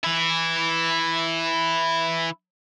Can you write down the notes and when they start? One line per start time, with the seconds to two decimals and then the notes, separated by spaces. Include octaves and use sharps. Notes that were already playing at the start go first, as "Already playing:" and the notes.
0.04 E3 E4